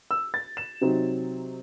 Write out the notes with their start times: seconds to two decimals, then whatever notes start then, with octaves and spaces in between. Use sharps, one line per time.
0.11 E6
0.34 A6
0.57 E7
0.81 C3 F#3 C4 D#4